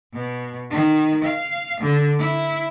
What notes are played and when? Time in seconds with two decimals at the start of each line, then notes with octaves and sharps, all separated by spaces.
0.13 B2
0.70 D#3
1.24 F5
1.80 D3
2.19 E4